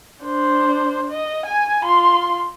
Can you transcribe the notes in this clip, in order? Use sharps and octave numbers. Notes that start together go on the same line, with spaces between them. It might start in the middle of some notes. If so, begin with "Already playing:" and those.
D4 C5
D#5
G#5
F4 C6